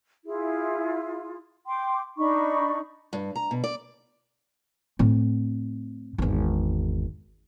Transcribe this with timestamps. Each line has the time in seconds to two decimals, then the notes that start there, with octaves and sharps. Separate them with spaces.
0.25 E4 F4 G#4
1.66 G5 C6 D6
2.17 D4 D#4 B5 C#6
3.13 G2
3.36 A#5
3.51 B2
3.64 D5
4.99 A2 C4
6.18 G#1 E2